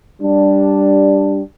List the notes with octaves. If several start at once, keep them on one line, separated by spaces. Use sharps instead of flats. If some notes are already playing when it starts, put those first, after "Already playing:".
G3 D4